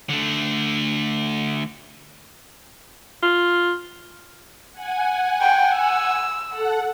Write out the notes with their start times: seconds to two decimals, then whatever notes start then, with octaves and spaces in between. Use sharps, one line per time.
0.09 D3 A3
3.23 F4
4.73 F#5 G#5
5.41 G5
5.76 E6
6.49 A4 F#5